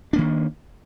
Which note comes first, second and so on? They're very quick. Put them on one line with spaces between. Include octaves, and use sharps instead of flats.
D4 A#3 D#3